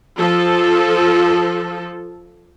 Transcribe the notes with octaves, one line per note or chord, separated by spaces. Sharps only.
F3 A4